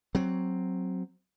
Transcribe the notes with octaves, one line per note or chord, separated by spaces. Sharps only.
F#3 C4